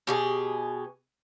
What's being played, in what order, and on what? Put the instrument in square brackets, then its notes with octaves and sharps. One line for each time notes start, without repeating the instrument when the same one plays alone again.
[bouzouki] B2 G4 G#4